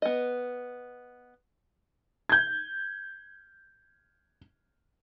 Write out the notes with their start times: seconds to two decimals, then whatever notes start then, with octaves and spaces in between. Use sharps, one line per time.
0.02 B3 D#5
2.29 G6 G#6